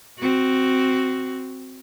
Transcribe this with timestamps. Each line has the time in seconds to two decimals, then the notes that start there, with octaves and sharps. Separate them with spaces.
0.19 C4 F#4